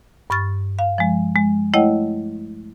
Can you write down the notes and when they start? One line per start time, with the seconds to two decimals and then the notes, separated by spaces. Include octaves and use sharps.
0.30 G2 C#6 F6 A6
0.79 F5
0.98 F3 G#3
1.36 G#3
1.74 A3 E4 C#5 D#5 F#5 G5